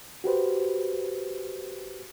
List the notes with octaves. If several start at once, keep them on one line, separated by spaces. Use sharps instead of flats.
F#4 G4 B4 C5